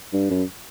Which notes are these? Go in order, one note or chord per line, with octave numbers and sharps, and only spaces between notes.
G2
F#2